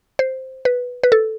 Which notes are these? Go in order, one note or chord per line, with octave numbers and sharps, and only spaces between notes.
C5
B4
B4
A4